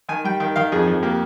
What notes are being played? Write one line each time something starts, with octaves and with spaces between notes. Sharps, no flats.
D#3 G#5
G3 G5
D#3 G5
D#3 F5
F2 G#4
F2
A#3 G4